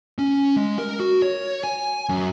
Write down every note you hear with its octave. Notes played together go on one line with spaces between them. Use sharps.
C#4
G#3
A#4
F#4
C#5
G#5
F#2